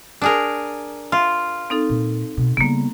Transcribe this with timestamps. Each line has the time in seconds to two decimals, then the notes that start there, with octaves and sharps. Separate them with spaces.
0.21 D4 G#4 A#4
1.12 F4
1.70 C4 D#4 A4
1.89 A#2
2.37 B2
2.57 C#3 G3 A#3 B3